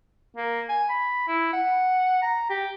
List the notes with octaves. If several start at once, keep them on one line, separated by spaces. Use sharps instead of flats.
A#3
G#5
B5
E4
F#5
A#5
G4